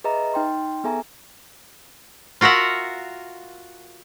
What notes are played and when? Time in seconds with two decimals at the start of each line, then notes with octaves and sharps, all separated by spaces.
0.04 G#4 B4 D#5 E5 A#5
0.34 D#4 G5 C6
0.84 B3 G#4 A4 E5 G#5 A#5
2.41 F4 F#4 A#4 E5 F#5